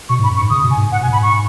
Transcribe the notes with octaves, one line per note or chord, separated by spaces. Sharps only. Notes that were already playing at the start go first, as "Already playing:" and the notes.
B2 C#6
G#2 B5
F#2
C#6
G#2
C#3 D#6
B2
G#5
G#2
G#2 F#5
B2 G#5
G#2 B5
C#6